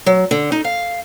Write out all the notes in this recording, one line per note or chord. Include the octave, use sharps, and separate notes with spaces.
F#3
D3
D#4
F5